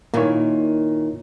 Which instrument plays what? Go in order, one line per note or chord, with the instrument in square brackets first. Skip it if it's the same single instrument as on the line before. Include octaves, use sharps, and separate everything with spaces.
[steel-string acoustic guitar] A#2 D#3 [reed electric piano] A#3 E4 C#5